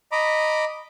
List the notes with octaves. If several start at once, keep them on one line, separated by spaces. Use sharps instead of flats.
D#5 A#5 B5 D6